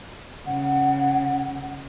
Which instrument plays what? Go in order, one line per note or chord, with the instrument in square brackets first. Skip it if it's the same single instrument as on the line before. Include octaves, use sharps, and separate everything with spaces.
[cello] C#3 [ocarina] F#5